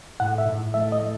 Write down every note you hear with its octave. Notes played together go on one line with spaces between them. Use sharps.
A2 F#5
E5
A2
A3 E5
D#5
A3